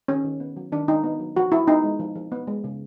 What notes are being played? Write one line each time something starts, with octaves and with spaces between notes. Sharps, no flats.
D#3 C#4
D#3
B3
F#3
D#3 D4
D#3 D#4
B3
F#3
F3 F#4
F3 E4
B3 D#4
G#3
F3
F3
B3
G#3
C#3